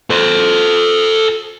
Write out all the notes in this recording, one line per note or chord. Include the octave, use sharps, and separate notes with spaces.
A4 C5